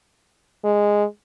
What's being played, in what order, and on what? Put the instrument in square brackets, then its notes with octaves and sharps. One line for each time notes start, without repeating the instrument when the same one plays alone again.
[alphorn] G#3